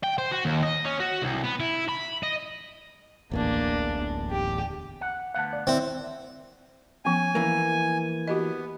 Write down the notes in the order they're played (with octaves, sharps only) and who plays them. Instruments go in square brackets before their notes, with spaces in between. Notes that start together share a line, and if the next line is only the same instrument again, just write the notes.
[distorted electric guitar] G5
C5
F#4
D#2
D#5
C#4
F#4
C2
B3
E4
B5
D#5
[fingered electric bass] D1 A1 E2 [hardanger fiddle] A#3 D4
[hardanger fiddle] G4
[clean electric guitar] F#5
[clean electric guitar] D2 B3 F#5 [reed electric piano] F5 A5
[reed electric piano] D5
[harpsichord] C4 [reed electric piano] E4 D5 E5
[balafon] F3 B3 C#4 [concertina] G#5
[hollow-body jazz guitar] E3 A#3
[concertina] B3 [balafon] F#4 G4 D#5